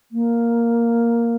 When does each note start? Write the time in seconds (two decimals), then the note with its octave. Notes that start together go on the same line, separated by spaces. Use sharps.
0.12 A#3